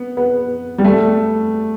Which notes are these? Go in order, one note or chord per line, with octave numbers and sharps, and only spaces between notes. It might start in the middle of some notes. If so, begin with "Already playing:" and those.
Already playing: B3
B3
G3
A3